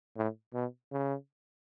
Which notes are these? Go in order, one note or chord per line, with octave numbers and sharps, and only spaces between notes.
A2
B2
C#3